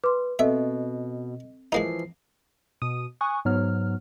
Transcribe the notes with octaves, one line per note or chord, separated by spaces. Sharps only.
B4 C6 D6
B2 C4 A4 D#5 E5
E3 F3 G#3 A#3 D#4 C7
B2 D#6 D#7
G#5 C#6 D#6 F#6
G#2 F#3 B3 F6